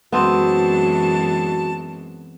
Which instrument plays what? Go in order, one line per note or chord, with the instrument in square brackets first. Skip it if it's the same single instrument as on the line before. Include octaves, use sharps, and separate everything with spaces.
[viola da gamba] F#2 E3 G#3 [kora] B3 C4 [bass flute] F#4 [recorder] A5